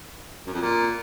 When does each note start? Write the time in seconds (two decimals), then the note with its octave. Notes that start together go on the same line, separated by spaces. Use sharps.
0.47 F#2
0.54 F2
0.61 A#2